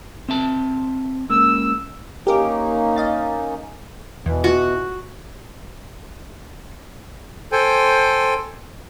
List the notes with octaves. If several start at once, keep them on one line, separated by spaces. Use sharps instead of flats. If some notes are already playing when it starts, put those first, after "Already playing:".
C4 E5 A5
C#2 C#3 A#3 E6
A#3 C#4 D#4 G4 A#4 D6
D#5 F5 A6
E2 B2 E3
F#4
A4 C5 G5 G#5